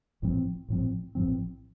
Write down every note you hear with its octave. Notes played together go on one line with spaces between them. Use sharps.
A1 A2 F3 C4
A1 A2 F3 C4
A1 A2 F3 C4